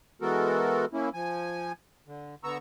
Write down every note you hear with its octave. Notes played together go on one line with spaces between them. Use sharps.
E3 G#3 B3 F#4 A4 A#4
A#3 C#4 E4
F3 G#5
D3
D3 B3 A#5 C#6 E6